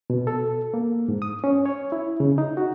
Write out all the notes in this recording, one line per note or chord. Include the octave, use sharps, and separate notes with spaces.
B2
A4
A#3
G#2
D#6
C#4
C#5
E4
C#3
D#4
F#4